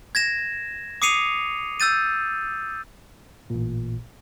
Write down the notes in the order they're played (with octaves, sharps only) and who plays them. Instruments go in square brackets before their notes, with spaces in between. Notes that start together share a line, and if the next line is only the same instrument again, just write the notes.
[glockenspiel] G#6 A#6 E7
D6 D#6 C7 C#7 D#7 F7
E6 G6 A6 D#7
[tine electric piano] A1 A#2